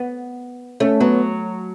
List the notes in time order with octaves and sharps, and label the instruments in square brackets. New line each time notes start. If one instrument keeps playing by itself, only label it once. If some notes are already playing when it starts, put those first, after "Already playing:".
Already playing: [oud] B3
[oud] A3 [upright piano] C#4
[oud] F#3 [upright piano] B3